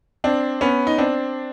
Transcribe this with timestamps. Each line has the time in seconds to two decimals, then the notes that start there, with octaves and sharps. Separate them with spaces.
0.24 C4 D4
0.61 B3 C#4
0.87 D#4
0.98 C4 D4